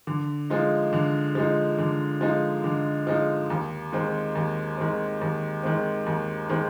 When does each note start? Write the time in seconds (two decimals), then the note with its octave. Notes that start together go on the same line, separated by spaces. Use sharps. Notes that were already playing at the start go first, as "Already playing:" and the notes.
0.07 D3
0.50 F3 G#3 D#4
0.93 D3
1.35 F3 G#3 D#4
1.78 D3
2.21 F3 G#3 D#4
2.64 D3
3.07 F3 G#3 D#4
3.50 D#2
3.92 D#3 G#3 C4
4.35 D#2
4.78 D#3 G#3 C4
5.21 D#2
5.63 D#3 G#3 C4
6.06 D#2
6.49 D#3 G#3 C4